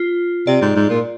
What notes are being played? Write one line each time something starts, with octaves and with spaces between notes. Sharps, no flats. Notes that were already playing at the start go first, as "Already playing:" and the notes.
Already playing: F4
C3 D5
G#2
G#2
A#2